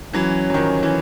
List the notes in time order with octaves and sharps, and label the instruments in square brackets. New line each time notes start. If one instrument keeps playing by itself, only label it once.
[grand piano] E3 F#3 [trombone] C#4
[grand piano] F#3
D#3 F3
E3